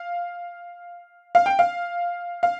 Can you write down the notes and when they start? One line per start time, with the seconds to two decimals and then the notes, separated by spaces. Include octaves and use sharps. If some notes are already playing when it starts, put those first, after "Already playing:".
Already playing: F5
1.35 F5
1.46 G5
1.59 F5
2.43 F5